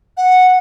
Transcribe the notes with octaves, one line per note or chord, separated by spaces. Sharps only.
F#5